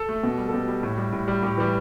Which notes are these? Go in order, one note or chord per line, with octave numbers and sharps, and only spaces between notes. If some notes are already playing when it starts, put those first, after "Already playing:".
Already playing: A4
A3
B2
G3
A4
B2 G4
G3
A2
G3
A2
G3
A2 G4
E3 G3